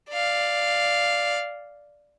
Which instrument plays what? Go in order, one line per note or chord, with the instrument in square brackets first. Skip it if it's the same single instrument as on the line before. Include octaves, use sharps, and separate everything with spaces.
[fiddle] D5 F5